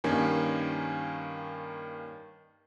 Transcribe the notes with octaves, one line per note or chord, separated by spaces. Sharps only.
G2 D#3 A#3 C#4 G#5